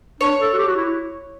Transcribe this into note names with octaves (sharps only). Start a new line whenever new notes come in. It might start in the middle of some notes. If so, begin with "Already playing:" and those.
D4 C#5
A4
F#4
G4
F#4
E4